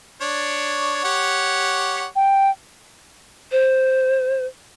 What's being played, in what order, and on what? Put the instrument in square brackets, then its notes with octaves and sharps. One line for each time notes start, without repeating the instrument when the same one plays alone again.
[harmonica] D4 C#5
G4 C#5 F#5
[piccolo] G5
[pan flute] C5